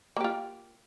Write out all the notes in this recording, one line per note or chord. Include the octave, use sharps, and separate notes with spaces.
A#3 F4 G4